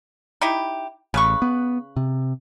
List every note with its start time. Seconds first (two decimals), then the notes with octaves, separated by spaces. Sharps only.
0.41 D#4 E4 G4
1.14 A1 C#3 B4 C#6
1.42 B3
1.97 C3